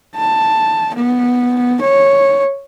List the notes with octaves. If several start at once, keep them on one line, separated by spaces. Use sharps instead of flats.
A5
B3
C#5